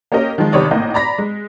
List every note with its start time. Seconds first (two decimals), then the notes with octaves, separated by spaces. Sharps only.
0.12 A#3 C#4 G4 A#4 D#5
0.38 D#3 F3 G#3
0.52 G1 C3 D#3 C#5 D5 D#6
0.71 G#1 A2 A#3 D#5
0.94 D5 A#5 B5 A#6 B6
1.18 G#3